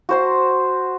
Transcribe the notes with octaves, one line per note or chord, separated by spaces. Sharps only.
F#4 C5 C6